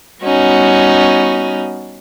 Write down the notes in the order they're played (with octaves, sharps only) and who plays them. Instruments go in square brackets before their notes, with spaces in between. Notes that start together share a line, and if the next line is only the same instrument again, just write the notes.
[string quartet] G3 B3 C#4 D#4 F#4